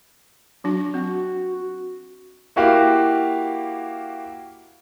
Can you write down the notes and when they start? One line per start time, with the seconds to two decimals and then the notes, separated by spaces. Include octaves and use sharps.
0.64 F#3 D4 F#4
0.94 C4 F#4
2.56 A#3 E4 F#4 G4 F5